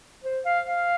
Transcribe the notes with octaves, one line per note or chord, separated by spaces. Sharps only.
C5
F5
F5